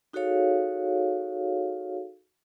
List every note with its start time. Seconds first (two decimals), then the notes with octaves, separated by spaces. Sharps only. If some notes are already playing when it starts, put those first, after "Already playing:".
0.13 D#4 F#4 G#4 A4 C#5 F5